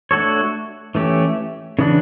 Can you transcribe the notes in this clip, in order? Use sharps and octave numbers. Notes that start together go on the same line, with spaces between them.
A3 D4 F#4 A4 C#5
E3 A3 C#4 G4
C#3 E3 B3 D4